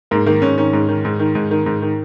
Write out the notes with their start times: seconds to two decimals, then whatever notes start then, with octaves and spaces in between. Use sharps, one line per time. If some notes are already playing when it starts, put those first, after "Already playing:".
0.11 G#2 A#3
0.26 D#3 A#3
0.42 G#2 C#4
0.58 D#3 C#4
0.73 G#2
0.89 D#3
1.05 G#2
1.19 D#3
1.35 G#2
1.51 D#3
1.66 G#2
1.82 D#3